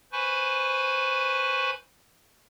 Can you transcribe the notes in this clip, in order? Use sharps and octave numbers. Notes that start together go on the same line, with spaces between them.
B4 C5 G#5 B5 C#6